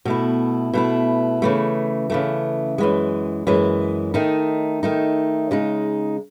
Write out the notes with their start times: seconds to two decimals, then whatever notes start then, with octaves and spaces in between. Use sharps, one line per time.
0.05 B2 A3 E4
0.73 B2 A3 E4
1.42 C#3 E3 A3
2.10 C#3 E3 A3
2.78 F#2 E3 G#3
3.47 F#2 E3 G#3
4.14 D#3 A3 D#4
4.83 D#3 A3 D#4
5.51 C#3 G#3 D#4